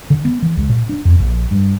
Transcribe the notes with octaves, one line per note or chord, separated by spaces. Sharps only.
D3
B3
E3
C#2
A#2
D4
F2
A#1
G2